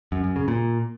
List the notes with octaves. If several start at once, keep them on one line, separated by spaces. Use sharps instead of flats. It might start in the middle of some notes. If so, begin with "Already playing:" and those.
F#2
F#2
C#3
A#2